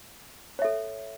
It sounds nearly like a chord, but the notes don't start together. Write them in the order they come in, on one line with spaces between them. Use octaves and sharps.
C#5 E5 A4